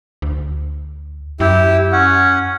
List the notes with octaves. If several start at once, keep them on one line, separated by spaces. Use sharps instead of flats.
D2
F#2 E4 G4
C#4 F#5